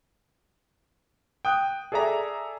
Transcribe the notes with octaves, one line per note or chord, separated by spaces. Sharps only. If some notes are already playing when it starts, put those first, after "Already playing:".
G5 D#6 F#6
G#4 A4 D5 E5 A#5